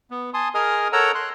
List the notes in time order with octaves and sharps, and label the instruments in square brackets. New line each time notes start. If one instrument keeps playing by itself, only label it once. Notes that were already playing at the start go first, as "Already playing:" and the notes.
[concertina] B3
G#5 A5 C6 D#6
G#4 A#4 D#5 G#5 D#6 F6
A4 A#4 C#5 F#5 A#5 E6
C6 F#6